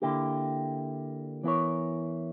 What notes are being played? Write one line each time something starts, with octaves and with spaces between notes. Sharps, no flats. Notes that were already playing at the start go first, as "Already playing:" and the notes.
D3 A#3 E4 G4
E3 B3 E4 A#4 C#5